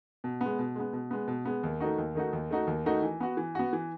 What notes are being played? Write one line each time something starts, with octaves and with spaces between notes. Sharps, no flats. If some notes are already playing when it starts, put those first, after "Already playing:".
B2
G#3 B3
B2
G#3 B3
B2
G#3 B3
B2
G#3 B3
D#2
D#3 A3 D#4 F#4
D#2
D#3 A3 D#4 F#4
D#2
D#3 A3 D#4 F#4
D#2
D#3 A3 D#4 F#4
E3
B3 F#4
E3
B3 F#4
E3